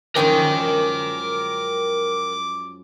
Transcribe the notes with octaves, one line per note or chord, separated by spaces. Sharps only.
F#2 F3 G#3 A#4 G5 D6